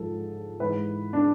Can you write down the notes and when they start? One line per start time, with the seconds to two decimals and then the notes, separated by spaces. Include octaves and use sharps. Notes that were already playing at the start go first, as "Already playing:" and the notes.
Already playing: G#2 F3 G#3 A4
0.60 G#2 E3 G#3 B4
1.13 D4